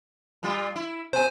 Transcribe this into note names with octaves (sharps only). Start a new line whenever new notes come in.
A#2 G3 F4
E4
B2 C5 G#5